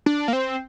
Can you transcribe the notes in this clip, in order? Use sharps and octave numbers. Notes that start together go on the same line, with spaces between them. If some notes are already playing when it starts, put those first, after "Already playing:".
D4
A#3
C4